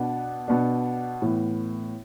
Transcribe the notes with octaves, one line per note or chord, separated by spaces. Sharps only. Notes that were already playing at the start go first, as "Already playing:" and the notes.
Already playing: B2 B3 D4
B2 B3 D4
A2 E3 B3